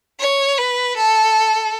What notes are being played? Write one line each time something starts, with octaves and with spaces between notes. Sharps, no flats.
C#5
B4
A4